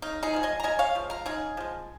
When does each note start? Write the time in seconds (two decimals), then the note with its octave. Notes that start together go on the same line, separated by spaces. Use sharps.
0.02 C#3 D#4
0.23 D#4 G#4
0.34 F3 G#3
0.43 D#5 G#5
0.60 A#5
0.64 C#3 D#5 G#5
0.79 C#5 F5
0.95 F3 G#3
1.10 F5 A#5
1.26 C#3 D#4 G#4
1.57 F3 G#3